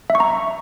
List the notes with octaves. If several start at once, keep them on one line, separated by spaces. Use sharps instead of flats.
E5
C#6
A#5